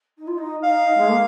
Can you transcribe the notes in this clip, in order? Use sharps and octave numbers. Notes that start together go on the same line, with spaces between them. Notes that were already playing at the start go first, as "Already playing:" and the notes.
D#4
F4
D#4
D#4 F5
G#3
A#3